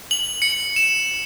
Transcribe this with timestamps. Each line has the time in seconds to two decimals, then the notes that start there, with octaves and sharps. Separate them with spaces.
0.11 F#7
0.42 C#7
0.76 E7